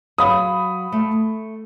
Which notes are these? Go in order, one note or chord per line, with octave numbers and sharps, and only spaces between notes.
F#3 F5 B5 D#6
A3